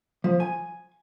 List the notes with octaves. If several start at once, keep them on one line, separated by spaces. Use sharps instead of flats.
F3
G#5